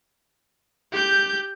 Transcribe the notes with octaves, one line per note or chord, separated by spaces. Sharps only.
G4 G6